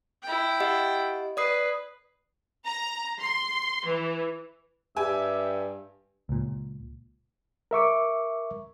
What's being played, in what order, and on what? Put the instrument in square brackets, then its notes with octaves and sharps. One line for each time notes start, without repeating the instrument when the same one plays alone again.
[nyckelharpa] E4 G5
[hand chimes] G4 D#5 F#5
[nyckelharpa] B4 [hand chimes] D5 D#6 C7
[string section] A#5
C6
E3
[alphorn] G2 [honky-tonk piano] G4 G#5 [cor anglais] E5
[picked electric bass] C#2 A#2
[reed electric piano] A#4 E5 C#6 D6